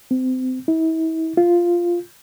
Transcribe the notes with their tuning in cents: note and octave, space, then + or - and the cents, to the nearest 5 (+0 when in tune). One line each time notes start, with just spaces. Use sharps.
C4 -30
E4 -40
F4 -5